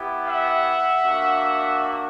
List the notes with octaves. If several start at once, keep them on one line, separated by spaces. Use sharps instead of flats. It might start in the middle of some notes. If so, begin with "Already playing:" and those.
Already playing: B3 E4 G4
E5 F#5
A#3 D4 F#4